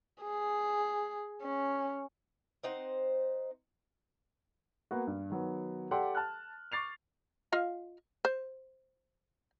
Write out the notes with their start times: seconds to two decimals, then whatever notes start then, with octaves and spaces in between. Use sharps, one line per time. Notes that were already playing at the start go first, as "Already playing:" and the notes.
0.23 G#4
1.43 C#4
2.63 C4 D#4 C5 F#5
4.91 A#3 B3 F#4
5.07 G2
5.30 D#3 F#3 B3
5.91 G4 A4 D5 F#5 G5 C6
6.15 A5 F6 F#6
6.72 C#6 D6 A6 C7 F7
7.52 F4 D#5 F5
8.25 C5